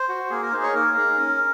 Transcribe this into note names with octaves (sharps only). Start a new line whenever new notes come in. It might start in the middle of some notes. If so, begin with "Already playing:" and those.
Already playing: C5
F#4
A#3 G#4
A#4
D#4 G#4 C5
C#5
A#3 A#4
D#4 G#4
C#4